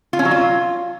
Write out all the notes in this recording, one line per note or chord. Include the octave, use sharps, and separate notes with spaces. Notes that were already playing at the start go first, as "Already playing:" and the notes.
F4
C#4
F#3
F4